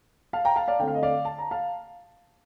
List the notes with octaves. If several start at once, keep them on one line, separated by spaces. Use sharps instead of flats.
F5 A5
G5 A#5
F5 A5
D5 F5
D3 A3 C4 G5
F5
D#5
D5 F5
A5
A#5
F5 A5